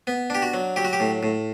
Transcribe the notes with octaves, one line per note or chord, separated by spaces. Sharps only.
B3
D4 G4
F#4
F#3
F#3 G4
F#4
G4
A2
A2